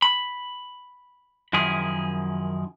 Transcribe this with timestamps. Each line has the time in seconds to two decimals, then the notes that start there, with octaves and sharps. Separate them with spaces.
0.02 B5
1.53 F#2 D#3 F3 E4 G#4